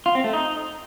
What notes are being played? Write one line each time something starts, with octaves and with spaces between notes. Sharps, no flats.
F4
C4
A3
D#4